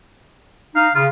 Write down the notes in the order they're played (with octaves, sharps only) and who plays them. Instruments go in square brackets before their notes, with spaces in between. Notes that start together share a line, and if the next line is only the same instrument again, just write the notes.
[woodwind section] D#4 [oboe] F5
[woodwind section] C#3 [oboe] F4